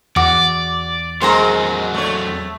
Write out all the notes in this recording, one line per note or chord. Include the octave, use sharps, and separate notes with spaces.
E2 F#4 D5 D6
F#3 G#3 C4 F#4 A#4 C5 G#5 A#5
A3 C#5